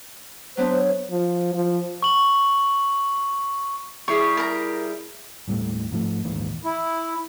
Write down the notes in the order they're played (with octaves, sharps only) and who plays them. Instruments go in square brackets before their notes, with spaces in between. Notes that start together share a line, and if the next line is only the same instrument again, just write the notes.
[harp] F#3 B3 D4 [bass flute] C5
[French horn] F3
F3
[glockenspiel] C#6 F#7
[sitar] G3 E4 G#4 [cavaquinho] C#6
[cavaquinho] A#4 A#5
[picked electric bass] D#1 A2 G3 A3
G#2 F3 A3
A#1 D#2 G#2 E3
[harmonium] E4